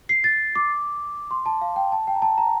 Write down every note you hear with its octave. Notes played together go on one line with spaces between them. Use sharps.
C7
A6
D6
C6
A5
F5
G5
A5
G5
A#5
A5
A#5